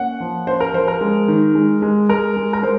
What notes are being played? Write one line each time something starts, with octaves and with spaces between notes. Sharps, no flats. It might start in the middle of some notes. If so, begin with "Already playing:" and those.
Already playing: A#3 C#4 F#5
F3
C#4 C5
A#4
F3 C5
A#4
G#3
D#3
G#3
G#3
G#3 A#4
G#3
A#4
G#3 C5